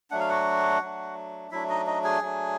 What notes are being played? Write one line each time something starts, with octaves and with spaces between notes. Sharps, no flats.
F#3 A3 D4 F#5
F5
F#4 F#5
F#3 A3 D4
F#3 A3 D4 E4 E5
D#4 D#5
D#4 D#5
G#4 G#5
F#3 A3 D4